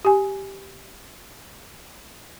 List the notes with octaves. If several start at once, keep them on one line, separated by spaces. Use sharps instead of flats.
G4 G#5